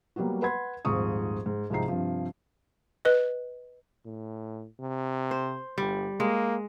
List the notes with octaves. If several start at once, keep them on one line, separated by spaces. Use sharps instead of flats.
F#3 G3 A#3 B3 F#4
B4 F#5 B5 C6 G#6
D#1 G#1 G#2 F3 C#6 D#6
G#2
C2 G#2 F3 C4 D#4 C7
G2 C3 F3
B4 D#5
A2
C3
C5
G1 G3
G#3 A#3